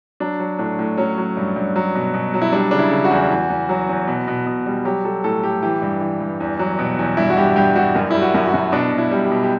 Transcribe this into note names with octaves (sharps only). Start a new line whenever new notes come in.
F#3 D4
F#3
A2 D4
A2
F#3 C#4
F#3
G2
G2
F#3
B2
B2
F#3
E4
G3 D4
C#3 D4
E4
C#3
F#4
E2
E2
E2
F#3
E2
B2
B2
B2
G3
F#3 G4
F#3 A4
A2 A4
A2 G4
E3 G4
G2
E3
G2
E2
F#3
B2
E2
G2 E4
F#4
G2 G4
G2 G4
G2 F#4
F#2
G3 E4
F#4
F#2
F#4
F#2
B2 D4
B2
E4
G3
G4
B2
G4